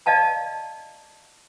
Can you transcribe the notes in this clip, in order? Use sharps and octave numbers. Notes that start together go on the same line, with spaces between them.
D5 D#5 F5 A5 A#5